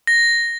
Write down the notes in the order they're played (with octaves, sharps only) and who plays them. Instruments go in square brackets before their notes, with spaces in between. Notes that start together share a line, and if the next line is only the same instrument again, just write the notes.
[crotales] A#6